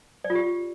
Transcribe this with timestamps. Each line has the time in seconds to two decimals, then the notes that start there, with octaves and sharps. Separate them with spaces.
0.24 D5
0.30 F4
0.35 G4